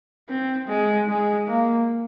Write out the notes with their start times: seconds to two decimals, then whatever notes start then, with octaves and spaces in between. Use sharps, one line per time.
0.29 C4
0.68 G#3
1.08 G#3
1.48 A#3